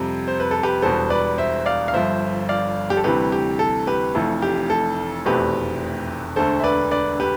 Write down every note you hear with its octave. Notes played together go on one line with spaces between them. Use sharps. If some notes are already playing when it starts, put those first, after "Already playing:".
Already playing: F2 C3 G3
C5
B4
A4
G4 B4
E1 E2 B2 G3 A4 C5
B4 D5
C5 E5
D5 F5
F5
G1 G2 F3 C5 E5
D5 F5
G4
A4
D2 C3 E3 G3 G4 B4
G4
A4
G4 B4
F1 F2 E3 A3 A4
G4
A4
F1 E2 B2 A3 C4 G4 B4
E1 D2 D3 A3 A4 C5
E5
B4 D5
B4 D5
G4 B4